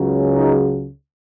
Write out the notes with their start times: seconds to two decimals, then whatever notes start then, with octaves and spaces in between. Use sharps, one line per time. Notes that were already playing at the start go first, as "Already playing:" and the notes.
Already playing: C#2 C#3 F#3
0.34 D#4